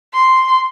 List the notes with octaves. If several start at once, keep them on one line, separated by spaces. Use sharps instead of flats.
C6